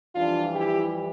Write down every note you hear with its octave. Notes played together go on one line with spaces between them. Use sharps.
F2 E3 G3 D4 F4
E4 G4